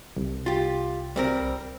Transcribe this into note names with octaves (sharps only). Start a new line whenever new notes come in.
C2
F4 G4
G3 C4 A#4